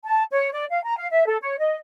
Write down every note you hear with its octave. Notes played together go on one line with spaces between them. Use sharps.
A5
C#5
D5
F5
A#5
F5
E5
A4
C#5
D#5